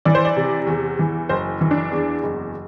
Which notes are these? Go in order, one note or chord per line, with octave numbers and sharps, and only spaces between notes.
E3 D5
C5
D5
C3
E2
E3
F#1 C5
E3
D4
E2
F#1